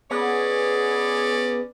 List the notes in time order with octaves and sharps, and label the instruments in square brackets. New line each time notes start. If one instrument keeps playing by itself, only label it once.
[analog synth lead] B3 [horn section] C#4 C#5 D5 [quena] G#4